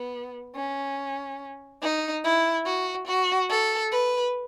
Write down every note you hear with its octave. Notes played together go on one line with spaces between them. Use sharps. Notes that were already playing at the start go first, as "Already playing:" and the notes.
Already playing: B3
C#4
D#4
E4
F#4
F#4
A4
B4